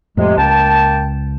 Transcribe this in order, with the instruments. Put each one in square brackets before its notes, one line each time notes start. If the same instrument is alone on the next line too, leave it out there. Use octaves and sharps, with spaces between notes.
[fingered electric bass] F2 A2 [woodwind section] C3 G#3
[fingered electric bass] C#2 [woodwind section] A#3 G5 A5